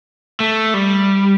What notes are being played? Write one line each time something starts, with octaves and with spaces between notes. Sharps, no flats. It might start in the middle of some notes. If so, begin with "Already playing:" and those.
A3
G3